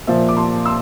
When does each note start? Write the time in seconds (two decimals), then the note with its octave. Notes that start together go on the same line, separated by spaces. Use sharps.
0.07 A#2 F3 C5 E5
0.28 D6
0.36 A5 C6
0.65 C6 E6